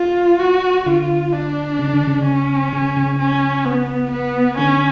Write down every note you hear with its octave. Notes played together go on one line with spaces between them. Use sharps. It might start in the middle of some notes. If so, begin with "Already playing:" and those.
Already playing: F4
F#4
D3 F4
D4
C#3
D3
C#3
C#4
C#3
C#3
C#4
B3
B3
D3 C#4